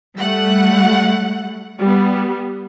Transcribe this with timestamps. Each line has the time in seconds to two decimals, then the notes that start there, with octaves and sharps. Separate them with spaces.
0.16 G3 A3 F#5
1.79 G3 B3